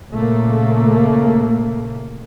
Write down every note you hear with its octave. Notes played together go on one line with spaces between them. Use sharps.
A#2 C#3 A3 A#3